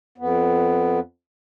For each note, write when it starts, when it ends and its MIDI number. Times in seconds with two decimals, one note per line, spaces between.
0.18 1.00 41
0.18 1.00 59